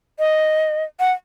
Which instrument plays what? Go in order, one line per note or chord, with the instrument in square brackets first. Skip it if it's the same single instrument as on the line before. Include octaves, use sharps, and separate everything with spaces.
[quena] D#5
F#5